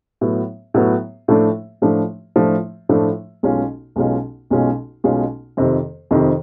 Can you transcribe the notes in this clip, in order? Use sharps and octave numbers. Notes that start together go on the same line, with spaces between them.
A2 F#3 B3
A2 F#3 B3
A2 F3 A3 D4
A2 F3 A3 D4
A2 F3 A3 D4
A2 F3 A3 D4
B1 B2 G#3 C#4 F4
B1 B2 G#3 C#4 F4
B1 B2 G#3 C#4 F4
B1 B2 G#3 C#4 F4
F2 C3 D#3
F2 C3 D#3